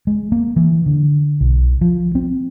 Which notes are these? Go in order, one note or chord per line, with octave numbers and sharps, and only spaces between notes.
G#3
A#3
E3
D3
B1
F3
C4